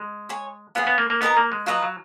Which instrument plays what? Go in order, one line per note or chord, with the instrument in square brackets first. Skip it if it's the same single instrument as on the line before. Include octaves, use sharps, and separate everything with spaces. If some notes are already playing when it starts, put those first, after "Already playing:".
Already playing: [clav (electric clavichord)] G#3
[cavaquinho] C#5 G#5 C#6
[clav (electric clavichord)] B3 [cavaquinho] F4 G#4 C#5 F#5
[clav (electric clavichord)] B3
A#3
A#3
[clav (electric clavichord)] B3 [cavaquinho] D#4 A#4 D#5 A#5
[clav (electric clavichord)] A#3
G#3
[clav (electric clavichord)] F#3 [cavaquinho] F4 B4 D#5 A#5
[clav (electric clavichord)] F#3